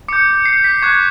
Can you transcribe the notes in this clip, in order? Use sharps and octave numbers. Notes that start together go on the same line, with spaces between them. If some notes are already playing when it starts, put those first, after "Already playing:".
D6 G6 C#7
C7
B6
C#6 F#6 G#6